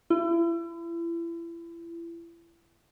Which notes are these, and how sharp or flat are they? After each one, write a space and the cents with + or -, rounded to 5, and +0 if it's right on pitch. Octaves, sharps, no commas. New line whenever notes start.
E4 +35